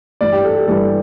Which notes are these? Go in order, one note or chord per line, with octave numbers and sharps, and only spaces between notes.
G2 E3 G3 D5
G4
A4
G4
G2 E3 G3 A4